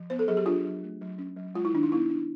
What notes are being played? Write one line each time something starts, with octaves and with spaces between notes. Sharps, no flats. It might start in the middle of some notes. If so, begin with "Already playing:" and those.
Already playing: F3
B3 C5
A4
F#3 G#4
G4
D4 F4
F#3
A3
F#3
C#4
F#3
G#3 F4
E4
D#3 D4
D#4
B3 E4
D4